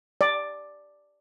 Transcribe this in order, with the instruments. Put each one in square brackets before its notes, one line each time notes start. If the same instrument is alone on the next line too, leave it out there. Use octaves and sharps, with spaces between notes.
[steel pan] D5